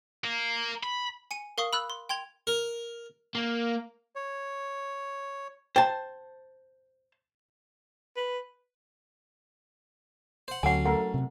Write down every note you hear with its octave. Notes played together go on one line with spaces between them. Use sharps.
A#3
B5
G#5 C#7 D#7
A#4 F5 C#6 D#6
B5 E6 F#6
C6
G5 C6 G#6 F7
A#4
A#3
C#5
C5 G5 A5
B4
C5 F#5
D2 F#3 C#4 G4 A4 F#5 G#5
A3 A4 A#4 F#5
C3